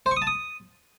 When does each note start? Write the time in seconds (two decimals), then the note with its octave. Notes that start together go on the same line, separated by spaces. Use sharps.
0.06 C5
0.11 C#6
0.17 D#6
0.22 A5
0.27 D#6